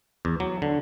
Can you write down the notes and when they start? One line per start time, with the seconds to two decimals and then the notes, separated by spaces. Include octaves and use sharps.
0.25 E2
0.40 F#3
0.62 D3